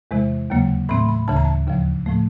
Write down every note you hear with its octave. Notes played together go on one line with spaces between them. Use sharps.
E2 C3 E3 G#3
D#2 C#3 F#3 A#3
A2 E3 A3 C4 B5
B5
D2 C#3 E3 A5
A#5
A5
D#2 C#3 F3
A2 F3 A3